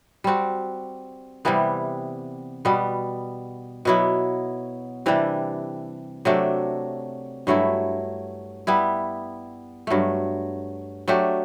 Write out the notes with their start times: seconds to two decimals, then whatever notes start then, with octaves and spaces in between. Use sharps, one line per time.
0.24 G3 C4 F#4
1.45 C3 E3 G3 B3
2.65 B2 G3 B3
3.85 B2 F#3 B3 E4
5.06 C3 E3 G3 D4
6.25 C3 F#3 A3 D4
7.47 G2 F#3 A3 E4
8.67 G3 B3 E4
9.87 G2 F#3 A3
11.08 F#3 A3 D4 G4